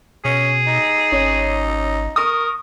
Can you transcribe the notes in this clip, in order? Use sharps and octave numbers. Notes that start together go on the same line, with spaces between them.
B2 C#4 G#4
D#4
G#1 C#4
A#4 C#6 D#6